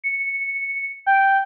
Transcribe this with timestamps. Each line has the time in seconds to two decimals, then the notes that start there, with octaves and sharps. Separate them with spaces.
0.04 C#7
1.06 G5